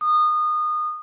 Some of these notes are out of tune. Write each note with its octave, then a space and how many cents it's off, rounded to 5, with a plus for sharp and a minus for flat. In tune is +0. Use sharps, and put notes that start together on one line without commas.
D#6 -25